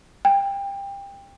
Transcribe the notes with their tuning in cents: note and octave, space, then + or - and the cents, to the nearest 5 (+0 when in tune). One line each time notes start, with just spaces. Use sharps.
G5 +25